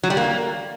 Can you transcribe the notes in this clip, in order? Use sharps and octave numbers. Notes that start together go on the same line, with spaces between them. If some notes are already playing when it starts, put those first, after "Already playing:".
F#3
G3
A#3